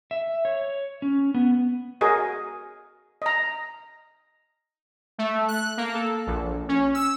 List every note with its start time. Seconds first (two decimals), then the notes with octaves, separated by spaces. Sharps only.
0.11 E5
0.45 C#5
1.02 C#4
1.34 B3
2.01 F#4 G#4 A#4 D#5
3.22 D#5 A#5
5.18 A3
5.48 F#6
5.77 A#3
5.94 A4
6.27 A#1
6.68 C#4
6.94 E6